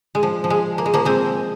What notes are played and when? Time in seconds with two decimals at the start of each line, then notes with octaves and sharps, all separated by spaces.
0.15 G#3
0.23 F3
0.44 F3
0.50 G#3
0.78 A#3
0.86 G#3
0.94 F3 A#3
1.05 G#3 C4